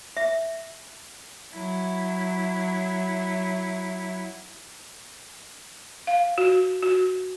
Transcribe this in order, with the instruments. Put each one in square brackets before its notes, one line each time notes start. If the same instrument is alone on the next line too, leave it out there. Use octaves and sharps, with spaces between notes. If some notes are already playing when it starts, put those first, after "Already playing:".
[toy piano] E5
[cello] F#3 E4
[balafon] F5
F#4
F#4